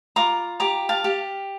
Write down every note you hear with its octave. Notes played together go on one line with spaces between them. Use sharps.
F4 A#5 D6
G4 A#5 D6
F5 A5
G4